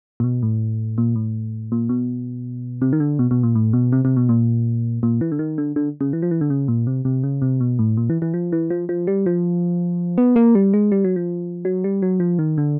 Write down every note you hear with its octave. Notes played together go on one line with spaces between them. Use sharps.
A#2
B2
A2
A#2
A2
A#2
B2
C3
D#3
D3
B2
B2
A#2
A2
B2
C3
C3
B2
A#2
A#2
E3
D3
D#3
D3
D3
C#3
E3
F3
E3
D3
C#3
A#2
C3
C3
C#3
C3
B2
A2
A#2
E3
E3
F3
E3
F3
F3
G3
F3
B3
A#3
G3
G#3
G3
F#3
F3
F#3
G3
F#3
F3
D#3
D3